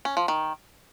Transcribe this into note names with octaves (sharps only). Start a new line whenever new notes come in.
C#4
F3
D#3